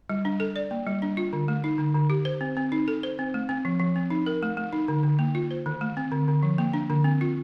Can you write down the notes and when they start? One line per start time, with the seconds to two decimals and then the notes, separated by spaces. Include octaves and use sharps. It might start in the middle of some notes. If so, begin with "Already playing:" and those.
0.09 G3
0.25 D4
0.40 A4
0.56 D5
0.71 A#3
0.87 G3
1.02 D4
1.17 F4
1.33 D3
1.48 A3
1.64 D#4
1.79 D3
1.95 D3
2.10 G4
2.25 C5
2.41 C4
2.57 C4
2.72 D#4
2.88 A4
3.03 C5
3.19 C4
3.34 A3
3.49 C4
3.65 F3
3.80 F3
3.96 C4
4.10 D#4
4.26 A#4
4.43 A3
4.57 A3
4.73 D#4
4.88 D3
5.03 D3
5.19 A#3
5.35 F4
5.51 C5
5.66 D#3
5.81 A3
5.97 C4
6.12 D3
6.28 D3
6.43 F3
6.58 A#3
6.74 D4
6.90 D3
7.04 C4
7.21 F4